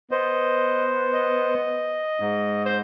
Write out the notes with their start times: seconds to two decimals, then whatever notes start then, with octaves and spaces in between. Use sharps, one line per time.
0.11 B3 C5 D#5
1.13 D#5
2.20 G#2
2.66 C5